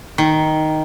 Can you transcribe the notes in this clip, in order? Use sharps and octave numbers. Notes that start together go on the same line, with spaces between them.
D#3